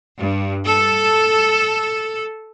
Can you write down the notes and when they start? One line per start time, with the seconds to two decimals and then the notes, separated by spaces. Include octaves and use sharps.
0.18 G2
0.64 A4